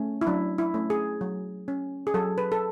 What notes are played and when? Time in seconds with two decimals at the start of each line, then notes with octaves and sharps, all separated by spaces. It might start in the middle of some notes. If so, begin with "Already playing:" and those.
Already playing: A3 C#4
0.21 E4
0.27 F#3 D4
0.58 E4
0.74 A3 C#4
0.90 G#4
1.21 F#3
1.68 C#4
2.07 G#4
2.14 F#3 A4
2.38 B4
2.52 A4